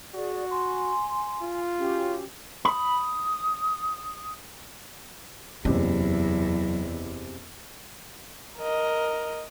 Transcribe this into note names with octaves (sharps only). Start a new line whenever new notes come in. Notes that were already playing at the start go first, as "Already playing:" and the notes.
F#4 G#4 D5
G#5 C6
F4
C#4 F#4 G4
B5 D#6
F#1 E2 C3 F#3 E4
A#4 D#5